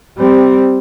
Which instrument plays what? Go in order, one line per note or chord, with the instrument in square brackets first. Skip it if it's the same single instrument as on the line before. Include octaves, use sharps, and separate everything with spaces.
[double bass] G3 C4